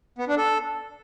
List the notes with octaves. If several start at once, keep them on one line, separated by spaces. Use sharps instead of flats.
B3
D4
A4